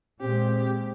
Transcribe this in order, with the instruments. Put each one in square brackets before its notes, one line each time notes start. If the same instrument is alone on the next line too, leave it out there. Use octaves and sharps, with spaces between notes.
[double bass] A#2 G#3 [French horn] C4 [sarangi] G4